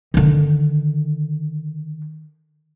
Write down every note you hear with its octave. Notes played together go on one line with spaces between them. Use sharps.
D3 D#3